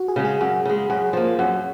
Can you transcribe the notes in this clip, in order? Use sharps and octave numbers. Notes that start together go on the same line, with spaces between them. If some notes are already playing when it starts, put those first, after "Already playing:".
Already playing: F#4
G#4
C#3 G#3
G#4
F#2 F#4
C#3 G#3
F#2 G#4
F3 A#3
F#2